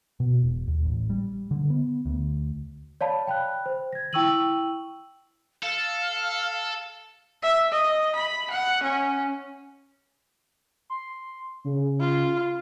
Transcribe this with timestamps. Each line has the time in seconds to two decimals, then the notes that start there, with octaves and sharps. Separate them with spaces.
0.20 B2
0.43 E1
0.68 D#2
0.85 A1
1.10 G3
1.51 D3
1.70 B3
2.06 D2
3.01 C#5 D5 F5 A5 B5
3.27 G5 B5 F#6
3.66 C5
3.93 G#6 A#6
4.13 E4 G5 C#6 E6 D#7 F#7
5.62 A4 F5
7.43 E5
7.73 D#5
8.15 B5
8.51 F#5
8.83 C#4
10.90 C6
11.65 C#3
12.00 F4